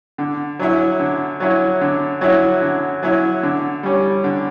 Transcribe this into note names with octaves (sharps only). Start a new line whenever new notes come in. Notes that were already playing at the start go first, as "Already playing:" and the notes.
D3
F#3 C#4 E4
D3
F#3 C#4 E4
D3
F#3 C#4 E4
D3
F#3 C#4 E4
D3
G3 C#4
D3